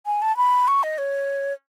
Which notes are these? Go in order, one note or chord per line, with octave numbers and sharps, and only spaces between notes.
G#5
A5
B5
C#6
D#5
C#5